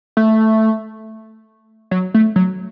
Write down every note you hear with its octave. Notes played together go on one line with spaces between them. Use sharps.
A3
F#3
A3
F#3